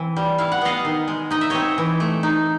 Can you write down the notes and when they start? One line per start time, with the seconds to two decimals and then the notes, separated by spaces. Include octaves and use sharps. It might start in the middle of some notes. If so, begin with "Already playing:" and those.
Already playing: E3 C4
0.16 G3
0.38 E4 F5
0.52 F#5
0.61 B3 D#5 F5
0.85 D#3
1.08 G#3
1.31 D#4 D#5
1.41 E5
1.50 C4 C#5 D#5
1.78 E3
2.00 A3
2.23 D#4